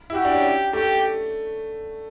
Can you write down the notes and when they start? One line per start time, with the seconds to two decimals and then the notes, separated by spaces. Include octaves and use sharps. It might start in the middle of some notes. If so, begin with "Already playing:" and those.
0.10 E4
0.14 F#4 G4
0.25 D4
0.35 C#4
0.73 A3 G4